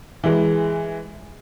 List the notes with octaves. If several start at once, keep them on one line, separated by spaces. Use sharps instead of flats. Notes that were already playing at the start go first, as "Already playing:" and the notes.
E3 G#3